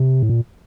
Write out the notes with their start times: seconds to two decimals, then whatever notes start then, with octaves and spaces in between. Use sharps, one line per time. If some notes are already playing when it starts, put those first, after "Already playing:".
Already playing: C3
0.23 A2
0.29 A#2